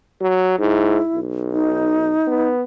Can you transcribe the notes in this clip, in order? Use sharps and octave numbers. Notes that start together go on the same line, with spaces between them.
F#3
G#2 E4
B1
D#4
B3